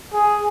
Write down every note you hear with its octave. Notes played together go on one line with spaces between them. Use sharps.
G#4